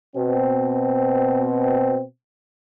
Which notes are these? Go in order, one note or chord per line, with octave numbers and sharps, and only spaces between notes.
B2 C4